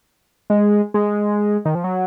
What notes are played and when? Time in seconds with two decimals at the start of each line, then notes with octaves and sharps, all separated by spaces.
0.50 G#3
0.94 G#3
1.65 D#3
1.75 F3
1.84 F#3